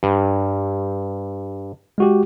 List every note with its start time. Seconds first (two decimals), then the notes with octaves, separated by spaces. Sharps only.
0.03 G2
1.98 G#3 F#4 G4